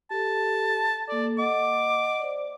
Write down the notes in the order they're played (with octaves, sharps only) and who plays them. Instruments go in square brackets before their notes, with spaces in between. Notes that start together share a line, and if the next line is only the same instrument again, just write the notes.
[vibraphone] G4 A4 [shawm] A5
[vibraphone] A#3 A4 [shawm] D5
[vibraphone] D#5 F#5 [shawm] D6
[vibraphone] C5 D5